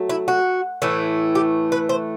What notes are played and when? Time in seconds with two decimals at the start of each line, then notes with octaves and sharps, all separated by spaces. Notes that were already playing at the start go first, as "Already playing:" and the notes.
Already playing: F#3 A3
0.10 E4
0.28 F#4
0.82 A2 E3 A3
1.35 G4
1.72 B4
1.89 C5